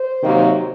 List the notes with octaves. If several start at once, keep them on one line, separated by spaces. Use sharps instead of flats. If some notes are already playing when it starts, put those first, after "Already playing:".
Already playing: C5
C3 D#3 F#3 A#3